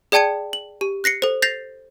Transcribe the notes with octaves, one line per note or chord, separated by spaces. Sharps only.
G#4 D5 G5 A5 G#6 C#7
F#7
G4
F#6 A#6 C7 C#7
A4 C5
G6 A6 A#6 C7 F7